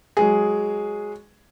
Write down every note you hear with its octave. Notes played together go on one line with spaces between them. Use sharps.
F#3 G#3 G#4